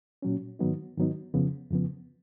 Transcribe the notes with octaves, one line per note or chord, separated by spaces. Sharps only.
A#2 F#3 C#4
G#2 D#3 F#3 B3 D#4
G#2 D#3 F#3 B3 D#4
F2 C#3 F3 B3
F2 C#3 F3 B3